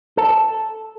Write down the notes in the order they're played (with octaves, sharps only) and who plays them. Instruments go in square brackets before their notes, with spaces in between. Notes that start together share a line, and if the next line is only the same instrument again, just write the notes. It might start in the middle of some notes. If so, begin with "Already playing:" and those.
[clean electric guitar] A4